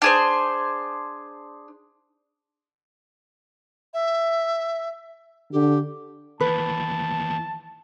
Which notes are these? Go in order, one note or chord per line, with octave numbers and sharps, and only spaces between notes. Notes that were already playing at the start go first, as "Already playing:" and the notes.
D4 G#4 C5
E5
D3 G4
D#2 E3 B4 A5